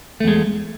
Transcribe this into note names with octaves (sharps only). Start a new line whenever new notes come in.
E2 G#3 A3